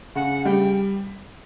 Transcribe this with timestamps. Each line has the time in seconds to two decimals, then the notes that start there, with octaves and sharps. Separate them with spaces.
0.15 C#3 F#5
0.39 F#5
0.45 G3 G5